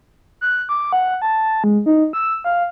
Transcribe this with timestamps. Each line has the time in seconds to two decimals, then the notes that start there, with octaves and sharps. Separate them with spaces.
0.41 F#6
0.69 D6
0.93 F#5
1.22 A5
1.64 G#3
1.86 D#4
2.13 E6
2.44 F5